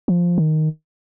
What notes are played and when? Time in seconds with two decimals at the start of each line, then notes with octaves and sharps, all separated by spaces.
0.08 F3
0.38 D#3